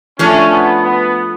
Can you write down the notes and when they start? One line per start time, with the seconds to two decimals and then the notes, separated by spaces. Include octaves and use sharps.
0.19 F3 A3 C#4 D4
0.52 B3
0.83 B3